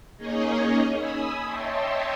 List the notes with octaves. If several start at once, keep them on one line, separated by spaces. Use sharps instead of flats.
A#3 C#4 D#4 G#4 C#5 D#5
G#5 B5 D#6 E6
C#5 D#5 E5 G5 A5 C6